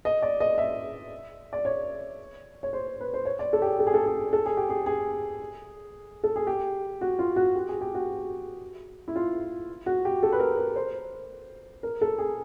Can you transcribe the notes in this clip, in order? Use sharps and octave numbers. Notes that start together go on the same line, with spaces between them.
D#5
D5
D#5
E5
D5
C#5
C#5
C5
B4
C5
C#5
D5
A4
G4
G#4
A4
G#4
A4
G#4
A4
G#4
G4
G#4
G#4
A4
G#4
G4
F#4
F4
F#4
G4
G#4
G4
F#4
E4
F4
F#4
G4
A4
B4
A#4
A#4
C5
A#4
A4
G#4